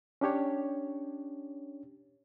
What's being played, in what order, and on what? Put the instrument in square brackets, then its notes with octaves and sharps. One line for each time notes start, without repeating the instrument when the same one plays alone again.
[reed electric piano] C#4 D4 G4 C#5